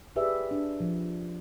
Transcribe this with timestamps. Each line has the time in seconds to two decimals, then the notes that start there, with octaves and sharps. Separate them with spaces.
0.16 E4 G4 G#4 B4 D5 E5
0.51 D4
0.80 F3